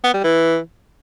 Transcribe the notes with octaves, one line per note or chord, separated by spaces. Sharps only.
B3
G3
E3